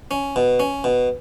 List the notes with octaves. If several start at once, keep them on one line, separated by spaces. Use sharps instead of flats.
C#4
B2
C#4
B2